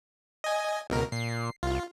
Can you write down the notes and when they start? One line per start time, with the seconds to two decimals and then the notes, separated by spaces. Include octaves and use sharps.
0.44 D#5 G#5
0.90 C#2 B2 A#4
1.12 A#2 C7
1.63 C2 F4